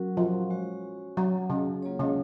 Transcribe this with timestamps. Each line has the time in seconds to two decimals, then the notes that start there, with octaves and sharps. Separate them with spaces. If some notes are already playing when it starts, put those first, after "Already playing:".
Already playing: F#3 C#4 F#4 A#4
0.17 F3
0.50 G#3 C#4 F#4 C#5
1.17 F#3
1.50 C#3
1.83 F#3 A#3 F4 G#4 C#5
2.00 C#3